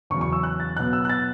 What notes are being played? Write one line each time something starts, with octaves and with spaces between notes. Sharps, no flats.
E2 C#3 F#3 C#6
C#6
E6
F#6
A6
B2 F#3 B3 F#6
E6
F#6
A6